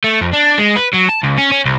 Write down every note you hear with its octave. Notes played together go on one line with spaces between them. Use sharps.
A3
F2
D4
G#3
B4
F#3
A5
C#2
C#4
C#4
C2